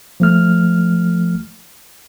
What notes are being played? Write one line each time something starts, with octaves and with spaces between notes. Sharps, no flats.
F3 A3 F6